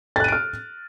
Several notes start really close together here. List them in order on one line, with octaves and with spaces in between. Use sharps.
A6 F#6 D#7 D7 F6